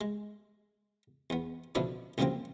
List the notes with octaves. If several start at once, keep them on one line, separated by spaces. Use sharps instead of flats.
G#3
E2 B3
B2 D3 F3 D4 E4 D5
C2 F#2 D3 F3 A#3 C4